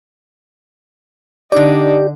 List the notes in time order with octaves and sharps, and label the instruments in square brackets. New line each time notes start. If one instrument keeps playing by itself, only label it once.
[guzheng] D3 D#5 [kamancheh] D4 D#4 [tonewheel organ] G4 [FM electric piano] D5